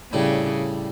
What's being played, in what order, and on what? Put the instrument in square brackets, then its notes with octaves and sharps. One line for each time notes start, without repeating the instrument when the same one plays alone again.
[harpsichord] A2 G3 D4 [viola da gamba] C#3